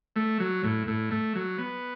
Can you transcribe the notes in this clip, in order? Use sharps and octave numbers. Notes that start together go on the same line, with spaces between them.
A3
F#3
A2
A2
A3
F#3
B3